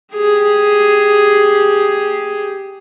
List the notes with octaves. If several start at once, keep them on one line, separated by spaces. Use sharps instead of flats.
G4 G#4